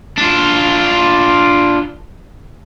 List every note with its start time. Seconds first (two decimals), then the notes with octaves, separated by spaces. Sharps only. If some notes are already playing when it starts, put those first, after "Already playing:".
0.17 D4 F4